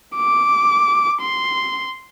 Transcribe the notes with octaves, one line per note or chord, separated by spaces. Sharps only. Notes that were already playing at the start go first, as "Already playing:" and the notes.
D6
C6